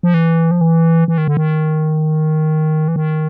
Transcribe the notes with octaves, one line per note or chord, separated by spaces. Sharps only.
F3
E3
F3
E3
E3
D#3
D3
D#3
E3
D#3